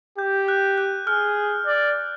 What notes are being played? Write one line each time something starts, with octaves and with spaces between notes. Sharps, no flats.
G4 G6
F#6
F#6
G#4 F6
D5